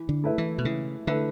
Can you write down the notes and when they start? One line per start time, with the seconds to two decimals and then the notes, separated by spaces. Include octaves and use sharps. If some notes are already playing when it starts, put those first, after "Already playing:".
Already playing: E3
0.09 D3
0.24 A3 E4 B4 E5
0.38 E3
0.58 B2
0.65 C#3 E3
1.07 D3 A3 E4 B4 E5